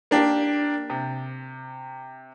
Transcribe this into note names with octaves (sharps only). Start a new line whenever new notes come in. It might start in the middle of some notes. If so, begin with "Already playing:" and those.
A#3 D4 G4
C3